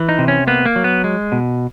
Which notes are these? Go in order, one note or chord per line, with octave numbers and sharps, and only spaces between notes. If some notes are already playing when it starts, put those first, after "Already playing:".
Already playing: E3
D#4
C3
C#4
A#3 B3
A#3
F#3
B3
G#3
B2